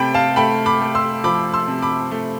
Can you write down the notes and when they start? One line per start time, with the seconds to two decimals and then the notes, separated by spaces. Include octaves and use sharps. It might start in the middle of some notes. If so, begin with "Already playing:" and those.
Already playing: C3 A3 G5 A5 B5
0.14 F5 A5
0.36 A3 G5 B5
0.66 B5 D6
0.81 A3
0.95 C6 E6
1.24 F3 B5 D6
1.54 C6 E6
1.68 C3
1.82 B5 D6
2.11 A3